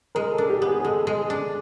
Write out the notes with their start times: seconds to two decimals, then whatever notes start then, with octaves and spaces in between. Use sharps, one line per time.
0.15 G#3 A#4
0.32 A4
0.38 D4
0.50 G4
0.62 B3
0.67 G#4
0.80 G#4
0.85 G#3 A4
1.07 G#3
1.18 G#4
1.30 D4